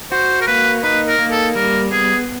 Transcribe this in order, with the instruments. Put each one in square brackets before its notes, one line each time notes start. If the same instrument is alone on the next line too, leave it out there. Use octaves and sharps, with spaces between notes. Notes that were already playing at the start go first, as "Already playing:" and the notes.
[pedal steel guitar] F#4 [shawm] C5
[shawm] A#4
[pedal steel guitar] A#3 [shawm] B4
[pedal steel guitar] D#4 [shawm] B4
[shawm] A#4
[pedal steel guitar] A#3
[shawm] A4
[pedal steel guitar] G3 [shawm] A#4
[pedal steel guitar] B3 [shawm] G#4